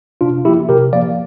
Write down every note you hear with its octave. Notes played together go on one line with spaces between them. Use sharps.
C3 D4 F4
F3 A#3 E4 G4
C3 G4 A#4
F3 A#3 D5 F5